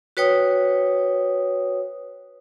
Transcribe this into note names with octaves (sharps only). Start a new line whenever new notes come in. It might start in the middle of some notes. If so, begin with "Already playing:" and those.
F#4 B4 C#5 G5 D#6